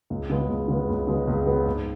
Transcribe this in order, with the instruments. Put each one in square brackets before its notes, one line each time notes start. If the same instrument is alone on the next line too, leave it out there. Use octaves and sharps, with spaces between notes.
[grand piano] C#2
C#3 G#3 B3
C#2
C#3 G#3 B3
C#2
C#3 G#3 B3
C#2
C#3 G#3 B3
G#2